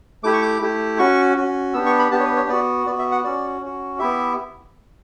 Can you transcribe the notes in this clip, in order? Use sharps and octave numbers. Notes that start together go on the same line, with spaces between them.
A3 E4 G4 D6
C#6
D6
A3 E4 G4
C#4 F#4 C#6
C#4 F#4
B3 D4 G4 E6
C#6
B5
B3 D4 G4 A5
C#5
B4
C#5
B3 F#4 D5
B3 F#4 D5
E5
F#5
C#4 F#4 D5
C#4 F#4
B3 E4 G4 E5